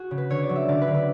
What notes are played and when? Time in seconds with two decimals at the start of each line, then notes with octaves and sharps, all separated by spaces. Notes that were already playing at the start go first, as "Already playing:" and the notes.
Already playing: F#4 G#4
0.11 C#3
0.18 B4
0.30 D3 C#5
0.43 D5
0.49 F#3
0.56 E5
0.68 D3 D5
0.81 B4
0.88 D3
0.94 B4